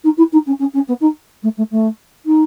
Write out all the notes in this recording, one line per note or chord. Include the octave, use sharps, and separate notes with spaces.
D#4
E4
D#4
C#4
C#4
C#4
B3
D#4
A3
A3
A3
D#4